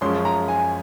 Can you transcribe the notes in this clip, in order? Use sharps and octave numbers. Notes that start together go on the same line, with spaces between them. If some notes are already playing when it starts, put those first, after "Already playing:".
F#2 F3 G#3 C#4 C6
A#5
G#5